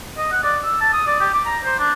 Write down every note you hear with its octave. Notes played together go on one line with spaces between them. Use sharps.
D#5
F#5
D5
E6
A5
D#6
D5
G4
D6
A#5
C5
D4